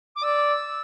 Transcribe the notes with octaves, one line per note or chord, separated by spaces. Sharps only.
D6
D5 E6